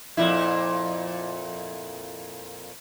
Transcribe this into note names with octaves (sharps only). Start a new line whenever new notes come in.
F2 A#2 E4